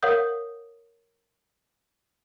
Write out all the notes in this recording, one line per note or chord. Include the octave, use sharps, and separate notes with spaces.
A#4 C#5 F5 F#5 D#6 G6